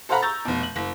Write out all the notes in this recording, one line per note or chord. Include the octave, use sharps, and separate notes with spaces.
A4 C5 F5 F#5 A#5 B5
A#5 C#6 E6 G6 A6
F1 B2
F#7
F#1